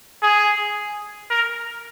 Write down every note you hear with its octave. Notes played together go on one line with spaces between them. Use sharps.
G#4
A#4